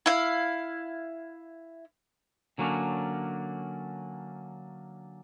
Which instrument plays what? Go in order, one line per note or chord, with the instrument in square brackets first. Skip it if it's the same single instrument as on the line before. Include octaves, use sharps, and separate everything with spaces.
[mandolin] E4 F5
[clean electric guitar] D3 F#3 A#3 C#4 D4